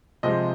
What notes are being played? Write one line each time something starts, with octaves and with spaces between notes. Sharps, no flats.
C3 F3 G#3 C4 D#5